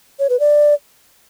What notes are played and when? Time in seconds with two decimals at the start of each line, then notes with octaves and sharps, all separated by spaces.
0.19 C#5
0.29 B4
0.40 D5